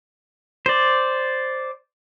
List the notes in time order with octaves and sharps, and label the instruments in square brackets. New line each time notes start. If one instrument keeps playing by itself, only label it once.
[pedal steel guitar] C5 D5